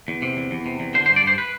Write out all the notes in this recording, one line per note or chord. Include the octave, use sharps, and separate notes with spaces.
E2
C3
E2
E2
C3
E2
D3 C5
C5
G2
D5
G2 C5
B4